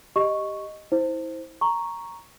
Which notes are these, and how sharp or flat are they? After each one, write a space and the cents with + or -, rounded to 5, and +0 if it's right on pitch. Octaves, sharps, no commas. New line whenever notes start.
G4 +0 D#5 +0 C#6 +0
E4 -30 C5 +0
A#5 +0 C#6 +0